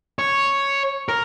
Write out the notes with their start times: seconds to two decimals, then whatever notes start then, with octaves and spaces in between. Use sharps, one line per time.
0.19 C#5
1.09 A#4